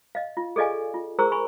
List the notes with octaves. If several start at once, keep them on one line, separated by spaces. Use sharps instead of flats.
D#5 F5
F4
G#4 A4 D5 D#5 F5 G#5
F4
G#4 A#4 C5 A#5 C#6 E6
G#5 B5 C#6